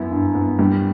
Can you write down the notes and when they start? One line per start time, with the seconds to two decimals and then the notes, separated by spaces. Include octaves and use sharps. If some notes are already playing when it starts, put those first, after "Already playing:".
Already playing: F#2 B3 E4
0.11 G2
0.35 B3
0.59 G2 G3